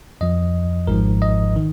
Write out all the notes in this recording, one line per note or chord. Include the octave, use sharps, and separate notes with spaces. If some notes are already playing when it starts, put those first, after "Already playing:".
F2 F3 D#5
G#1 G#2 F3 A#4
D#5
D#3